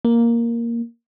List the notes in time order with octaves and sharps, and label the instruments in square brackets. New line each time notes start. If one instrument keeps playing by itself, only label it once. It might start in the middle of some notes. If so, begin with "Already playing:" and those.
[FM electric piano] A#3